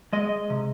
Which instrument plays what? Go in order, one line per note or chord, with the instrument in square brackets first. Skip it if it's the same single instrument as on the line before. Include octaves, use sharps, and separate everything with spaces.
[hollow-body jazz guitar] G#3 D#5
C3